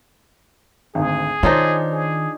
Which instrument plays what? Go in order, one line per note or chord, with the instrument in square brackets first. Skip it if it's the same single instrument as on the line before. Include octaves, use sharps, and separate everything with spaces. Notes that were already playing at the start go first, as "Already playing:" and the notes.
[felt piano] G#1 D2 [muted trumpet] G#4
[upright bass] D#3 [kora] D4 D#4 F4 [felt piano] C5 C#5
[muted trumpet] G#4